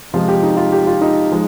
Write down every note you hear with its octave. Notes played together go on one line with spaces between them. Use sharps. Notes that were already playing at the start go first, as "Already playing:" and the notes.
C3 F3 G#3 F4
G4
D#4
F4
G4
F4
D#4
F3 G#3